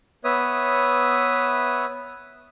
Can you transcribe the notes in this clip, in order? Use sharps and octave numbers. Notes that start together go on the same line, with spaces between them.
B3 B4 C#5 E5 D#6